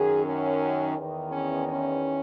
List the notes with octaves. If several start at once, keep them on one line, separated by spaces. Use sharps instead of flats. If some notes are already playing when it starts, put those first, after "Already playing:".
Already playing: F#2 D#3 G#4
C#4
E2 D#3
C#4
C#4